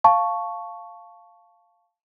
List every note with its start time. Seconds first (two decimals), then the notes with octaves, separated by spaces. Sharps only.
0.04 F5 A5 C#6